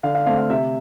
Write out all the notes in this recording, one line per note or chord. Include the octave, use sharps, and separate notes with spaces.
D3 F5
F5
A3 C4 F5
F5
C3 E5